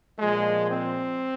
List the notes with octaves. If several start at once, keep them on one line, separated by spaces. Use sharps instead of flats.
A#2 F3 G#3
C4